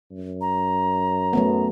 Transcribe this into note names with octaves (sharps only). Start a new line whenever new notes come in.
F#2
A#5
F#3 A3 B3